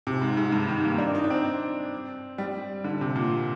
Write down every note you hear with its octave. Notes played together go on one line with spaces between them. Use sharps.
C3
G#2
G#2
G2
D#3
A#3
D4
D#4
D4
C4
G3
D3
C3
A#2